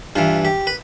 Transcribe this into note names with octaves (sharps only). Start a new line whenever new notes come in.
G2 E3 F4
G4
B4